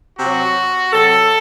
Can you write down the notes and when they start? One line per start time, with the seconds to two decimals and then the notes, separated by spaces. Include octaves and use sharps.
0.19 C3 F#3 F#4
0.93 C3 F#3 A4